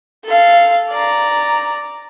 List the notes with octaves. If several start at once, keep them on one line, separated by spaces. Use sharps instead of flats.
A4 F5
D5 A#5